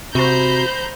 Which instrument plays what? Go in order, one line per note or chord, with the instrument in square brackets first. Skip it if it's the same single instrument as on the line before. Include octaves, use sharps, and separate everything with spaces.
[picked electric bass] C3 [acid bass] F#4 [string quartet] C5 [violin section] A#5 B5 G6